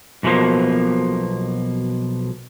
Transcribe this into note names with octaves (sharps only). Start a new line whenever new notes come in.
B1 B2 D3 F3 A#3